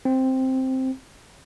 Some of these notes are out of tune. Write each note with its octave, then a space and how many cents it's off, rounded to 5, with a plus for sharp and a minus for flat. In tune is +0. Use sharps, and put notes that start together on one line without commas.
C4 +0